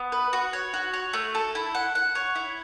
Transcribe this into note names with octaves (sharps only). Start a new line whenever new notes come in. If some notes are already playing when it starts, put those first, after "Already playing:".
Already playing: B3
B4
F#4
C#5
F#4
C#5
A3
A4
E4
F#5
F#5
C#5
E4